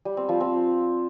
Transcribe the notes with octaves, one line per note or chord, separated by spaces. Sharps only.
G3
C4
F3
C4